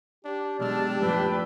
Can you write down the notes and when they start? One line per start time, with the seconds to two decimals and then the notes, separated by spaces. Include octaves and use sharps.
0.25 D4 G4
0.60 B2 F#3 G#3 D4 A5 E6 F6
1.00 F#2 A2 F3 B4 G5 E6